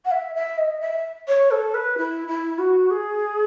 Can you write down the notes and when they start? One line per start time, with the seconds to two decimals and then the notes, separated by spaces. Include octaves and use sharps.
0.04 F#5
0.11 E5
0.35 E5
0.58 D#5
0.80 E5
1.28 C#5
1.51 A4
1.74 B4
1.97 E4
2.28 E4
2.58 F#4
2.90 G#4